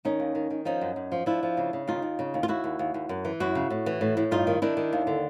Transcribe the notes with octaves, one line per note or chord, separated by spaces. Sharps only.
D#3 C#4 D#4
D#2
D#3
D#3
F3 C#4 D#4
F#2
F#2
F3
F3 D4 E4
F3
C#3
C#3
D#2 D#4 F4
D#2
C#3
D#2
F4
D#2 E4 F#4
D#2
D#2
D#2
F#2
E3
F#2 E4 F#4
C#3
A2
E3
A2
A2
G2 D#4 F4
D#3
D#3 D4 E4
D#3
D#2
D3